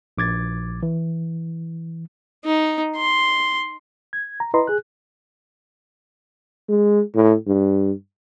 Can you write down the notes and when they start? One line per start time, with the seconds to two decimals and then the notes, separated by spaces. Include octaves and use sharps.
0.18 A#1 D6 G#6 A6
0.83 E3
2.45 D#4
2.96 C6
4.13 G#6
4.40 A#5
4.54 E4 B4 D#5 A#5 C6
4.67 G#4 F#6
6.69 G#3
7.15 A2
7.47 G2